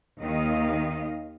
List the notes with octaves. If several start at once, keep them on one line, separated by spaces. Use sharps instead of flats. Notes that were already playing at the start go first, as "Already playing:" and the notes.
D#2 D#3 D#5 F5